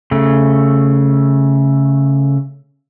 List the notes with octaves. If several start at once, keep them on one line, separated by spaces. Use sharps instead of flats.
C#3 A3